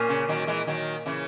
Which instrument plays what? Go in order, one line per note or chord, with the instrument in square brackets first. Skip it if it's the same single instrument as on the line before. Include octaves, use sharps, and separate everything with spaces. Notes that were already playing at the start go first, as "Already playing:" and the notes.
Already playing: [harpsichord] A#2 A#3 C#4
[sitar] C#3
D#3 F#3
E3 G#3
D#3 F#3
C#3 E3